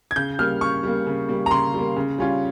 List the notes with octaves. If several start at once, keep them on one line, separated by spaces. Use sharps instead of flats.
G#6
C#3 G6
G3 A#3 F6
C#3 C#6
G3 A#3
C#3
G3 A#3
A#5
C#3 C6
G3 A#3
C#3
G3 C#4 F4